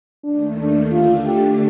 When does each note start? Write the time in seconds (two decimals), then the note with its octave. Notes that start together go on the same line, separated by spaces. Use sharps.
0.24 D#2 D#3 A3 D4
0.59 D4
0.91 D3 A3 D4 F4
1.25 G4